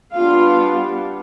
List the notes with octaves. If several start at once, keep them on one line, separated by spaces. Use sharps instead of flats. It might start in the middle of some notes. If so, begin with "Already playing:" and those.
G3 B3 D4 F4 F5